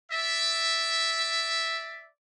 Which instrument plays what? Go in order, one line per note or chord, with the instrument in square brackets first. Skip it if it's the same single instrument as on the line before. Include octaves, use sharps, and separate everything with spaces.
[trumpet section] D5 E5